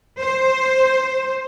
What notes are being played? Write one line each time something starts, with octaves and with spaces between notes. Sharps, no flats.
C5